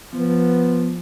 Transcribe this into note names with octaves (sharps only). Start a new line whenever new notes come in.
F3 B3